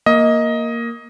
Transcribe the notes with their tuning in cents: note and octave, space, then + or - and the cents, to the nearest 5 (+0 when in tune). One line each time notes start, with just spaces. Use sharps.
A#3 +0 D#5 +15